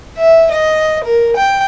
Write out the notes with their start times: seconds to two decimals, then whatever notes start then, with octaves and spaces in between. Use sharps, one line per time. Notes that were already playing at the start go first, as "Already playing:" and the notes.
0.17 E5
0.52 D#5
1.04 A#4
1.37 G5